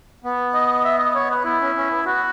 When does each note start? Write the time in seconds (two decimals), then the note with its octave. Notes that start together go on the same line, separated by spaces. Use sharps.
0.24 B3
0.54 D#5
0.85 E5
0.99 D#5
1.15 C#5
1.30 B4
1.44 B3 E4
1.61 C#4
1.75 C#4
1.90 B3
2.06 B3 F#4